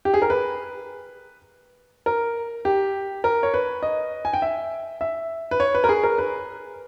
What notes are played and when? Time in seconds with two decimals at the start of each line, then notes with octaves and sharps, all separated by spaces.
0.05 G4
0.14 G#4
0.22 A#4
0.30 B4
2.06 A#4
2.65 G4
3.24 A#4
3.43 C#5
3.54 B4
3.83 D#5
4.25 G#5
4.33 G5
4.42 E5
5.01 E5
5.51 B4
5.60 C#5
5.75 B4
5.84 A#4
5.89 G#4
6.04 A#4
6.18 B4